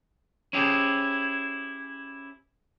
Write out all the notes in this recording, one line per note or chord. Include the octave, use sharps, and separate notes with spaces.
C#4 E4 G4 G#4 C5